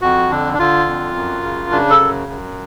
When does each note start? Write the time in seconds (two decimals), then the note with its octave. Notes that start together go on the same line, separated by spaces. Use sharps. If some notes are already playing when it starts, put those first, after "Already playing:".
0.02 F2 F#4
0.30 D3 D4
0.54 D4
0.59 D3 F4
0.87 F2
1.16 F#2
1.43 C#3
1.71 C#3 D4
1.90 A4
1.99 F#2
2.28 F#2